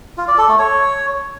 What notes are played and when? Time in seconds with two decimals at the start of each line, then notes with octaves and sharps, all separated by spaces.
0.18 F4
0.28 D5
0.38 A4
0.48 A3
0.59 C#5